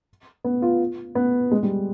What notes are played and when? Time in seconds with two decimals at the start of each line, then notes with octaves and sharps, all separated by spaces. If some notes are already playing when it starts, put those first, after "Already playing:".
0.44 B3
0.62 F4
1.15 B3
1.51 G#3
1.63 G3